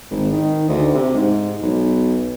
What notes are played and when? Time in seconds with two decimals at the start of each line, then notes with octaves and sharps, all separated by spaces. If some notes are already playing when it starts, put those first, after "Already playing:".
0.11 G#1
0.32 D#3
0.68 D2
0.94 C3
1.14 G#2
1.62 B1